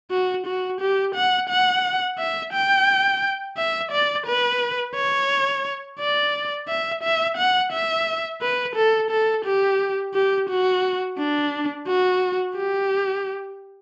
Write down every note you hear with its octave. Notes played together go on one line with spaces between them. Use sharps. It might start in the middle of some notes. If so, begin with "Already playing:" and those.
F#4
F#4
G4
F#5
F#5
E5
G5
E5
D5
B4
C#5
D5
E5
E5
F#5
E5
B4
A4
A4
G4
G4
F#4
D4
F#4
G4